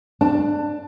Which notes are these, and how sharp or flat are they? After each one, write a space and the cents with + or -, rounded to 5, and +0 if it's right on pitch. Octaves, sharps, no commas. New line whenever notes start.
D4 +20 A5 +10